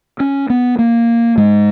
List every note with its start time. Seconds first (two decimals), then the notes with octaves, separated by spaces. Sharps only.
0.20 C#4
0.50 B3
0.79 A#3
1.37 G#2 G#3